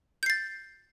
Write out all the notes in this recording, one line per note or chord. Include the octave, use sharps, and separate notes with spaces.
G6 A6 C7